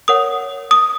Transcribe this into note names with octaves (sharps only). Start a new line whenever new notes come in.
A#4 C#5 F#5 D#6
D#6